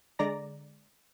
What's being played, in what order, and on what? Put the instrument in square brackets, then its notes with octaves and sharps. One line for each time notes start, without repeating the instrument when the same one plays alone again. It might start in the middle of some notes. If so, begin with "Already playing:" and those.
[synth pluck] D3 G#3 D5 A#5 A#6